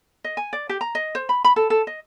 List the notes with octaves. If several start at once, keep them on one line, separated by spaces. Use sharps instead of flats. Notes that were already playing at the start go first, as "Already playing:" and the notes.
D#5
G#5
D5
G4
A#5
D#5
C5
B5
B5
A4
A4
D#5